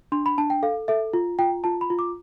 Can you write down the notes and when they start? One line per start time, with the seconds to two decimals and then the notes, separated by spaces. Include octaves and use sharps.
0.12 D4 C6
0.26 B5
0.38 D4 A5
0.50 G5
0.63 A4 F5
0.88 A4 E5
1.13 F4
1.39 F4 G5
1.64 F4 A5
1.81 B5
1.90 F4
1.99 D6